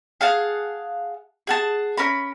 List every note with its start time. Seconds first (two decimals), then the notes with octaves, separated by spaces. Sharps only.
0.21 G#4 F5 F#5 A5
1.47 G#4 F#5 A5
1.97 C#4 A#4 B5